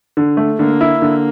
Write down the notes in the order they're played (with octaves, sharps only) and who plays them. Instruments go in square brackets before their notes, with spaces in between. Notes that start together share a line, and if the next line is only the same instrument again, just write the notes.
[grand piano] D3
A3
[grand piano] D3 [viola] A#3
[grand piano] E4
[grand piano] D3 [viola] A#3